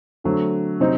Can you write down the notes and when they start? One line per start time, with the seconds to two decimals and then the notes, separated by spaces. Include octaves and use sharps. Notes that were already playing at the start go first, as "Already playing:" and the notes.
0.24 D3 F#3 A3 C4
0.80 C3 F#3 C4 D#4